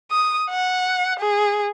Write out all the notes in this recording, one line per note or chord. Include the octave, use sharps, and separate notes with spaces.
D#6
F#5
G#4